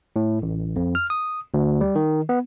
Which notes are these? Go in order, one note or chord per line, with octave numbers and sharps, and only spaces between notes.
A2
A1
F2
F6
D#6
D2
G3
D#3
B3